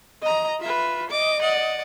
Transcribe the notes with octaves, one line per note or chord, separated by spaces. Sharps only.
D#5 A#5
F4 B4 E5
D#5 D6
D5 F#5